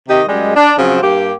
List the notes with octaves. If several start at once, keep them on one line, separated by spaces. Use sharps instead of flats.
C3 D#3 G4 D#5
F#2 G3 G#3
D4
C#3 F3 F#3 C4
G2 A#3 G4